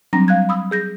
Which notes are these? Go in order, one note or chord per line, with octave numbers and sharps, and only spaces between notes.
F#3 G3 C4 D4 A#5 A#6
G3 F5 F#6 G#6
B5 D#6 E6
G#4 G6 A#6